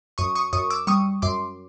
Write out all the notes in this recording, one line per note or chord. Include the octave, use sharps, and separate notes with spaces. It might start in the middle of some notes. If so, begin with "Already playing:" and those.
F#2 C#6 D#6
C#6 D#6
F#2 C#6 D#6
D6 E6
G3 C#6 D#6
F#2 C6 D6